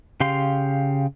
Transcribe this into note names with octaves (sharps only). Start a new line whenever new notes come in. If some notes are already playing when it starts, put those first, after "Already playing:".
C#3 G4 F5 C6